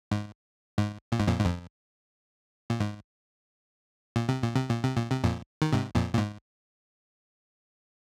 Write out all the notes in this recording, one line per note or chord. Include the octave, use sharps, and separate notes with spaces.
G#2
G#2
A#2
G#2
F2 A#2
G#2
F2
A#2
G#2
A#2
C3
A#2
C3
A#2
C3
A#2
C3
F2 A#2
D#3
G#2 C3
F2 A#2
A#2
G#2